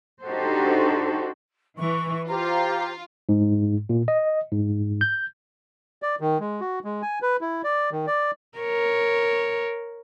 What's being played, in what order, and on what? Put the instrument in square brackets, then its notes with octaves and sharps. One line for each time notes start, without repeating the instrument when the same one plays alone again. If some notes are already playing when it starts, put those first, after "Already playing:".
[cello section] D4 D#4 F#4 G4 A4 C5
[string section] E3 [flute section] C#6
[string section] F4 [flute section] G4 C5 A#5
[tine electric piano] G#2
A#2
D#5
G#2
G6
[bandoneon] D5
D#3
G#3
F#4
G#3
G#5
B4
E4
D5
D#3
D5
[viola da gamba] A#4 C#5